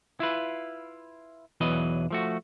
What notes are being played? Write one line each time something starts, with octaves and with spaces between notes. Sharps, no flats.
E4 F4 B4
B1 E2 E3 F#3 B4 D#5
F3 A3 F#4